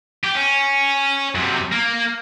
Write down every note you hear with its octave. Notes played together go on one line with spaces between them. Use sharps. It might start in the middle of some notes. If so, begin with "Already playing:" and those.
G4
C#4
F#2 C3
A#3